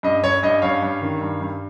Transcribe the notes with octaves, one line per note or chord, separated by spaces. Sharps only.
G2 D#5
G2 C#5
G2 D#5
G2 C#5 F5
G2
D#3
G2
G2